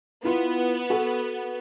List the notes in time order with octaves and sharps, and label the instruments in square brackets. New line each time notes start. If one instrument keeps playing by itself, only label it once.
[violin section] B3 [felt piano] E4 F4
[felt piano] F#4 A4